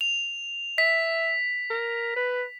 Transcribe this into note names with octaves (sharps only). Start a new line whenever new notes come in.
F7
E5 B6
A#4
B4